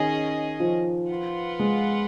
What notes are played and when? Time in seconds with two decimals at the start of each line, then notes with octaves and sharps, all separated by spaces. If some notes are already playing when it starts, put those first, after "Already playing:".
Already playing: D#3 C#4 G#4 D#5
0.60 F3
1.09 F4 B4 F#5
1.59 G#3